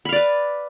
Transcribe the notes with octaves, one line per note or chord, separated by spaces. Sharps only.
B4 D5 F5 B5